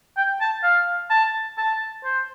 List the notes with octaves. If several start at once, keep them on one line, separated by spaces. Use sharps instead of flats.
G5
A5
F5
A5
A5
C5